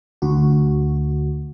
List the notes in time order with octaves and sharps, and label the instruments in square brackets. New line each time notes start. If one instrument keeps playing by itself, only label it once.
[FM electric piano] D2 F#4